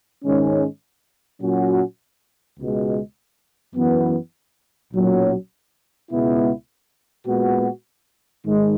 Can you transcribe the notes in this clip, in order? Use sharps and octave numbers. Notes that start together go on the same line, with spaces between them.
G#2 D#3 G#3 C#4
A#2 F#3 C#4 F#4
C#2 B2 G#3
F#2 E3 B3
B1 A#2 F#3 C#4
C#2 B2 G#3 B3 E4
A#2 G#3 B3 F#4
G#2 D#3 G#3